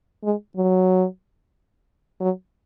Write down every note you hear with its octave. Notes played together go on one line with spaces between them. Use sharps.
G#3
F#3
F#3